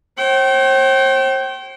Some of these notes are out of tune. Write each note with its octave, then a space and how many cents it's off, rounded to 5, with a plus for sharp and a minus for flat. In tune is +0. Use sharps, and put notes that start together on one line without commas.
C5 +40 G5 -30